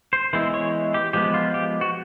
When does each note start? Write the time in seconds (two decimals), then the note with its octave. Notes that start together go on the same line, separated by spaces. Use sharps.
0.13 C5
0.33 E3 G#3 B3 E4 C5
0.54 C#5
0.94 G4
1.13 F3 G#3 B3 G4
1.34 F4
1.54 G4
1.81 F#4